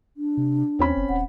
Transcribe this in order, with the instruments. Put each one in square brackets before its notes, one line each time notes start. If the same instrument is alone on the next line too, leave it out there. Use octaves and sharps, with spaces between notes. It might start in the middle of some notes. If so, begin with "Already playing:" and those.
[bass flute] D4
[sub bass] C3
[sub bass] D#2 [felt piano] C4 C#4 B5
[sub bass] F#1
[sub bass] D#1 [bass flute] F#5